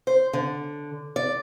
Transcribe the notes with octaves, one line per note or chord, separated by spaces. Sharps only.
C5
D3
D5